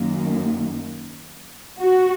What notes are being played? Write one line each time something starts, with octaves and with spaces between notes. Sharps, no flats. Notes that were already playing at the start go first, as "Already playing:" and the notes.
Already playing: F#2 D#3 A#3
F#4